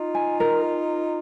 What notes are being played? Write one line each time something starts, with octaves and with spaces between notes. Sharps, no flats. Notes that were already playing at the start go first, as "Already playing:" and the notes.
Already playing: D#4 F4
G#5
A#4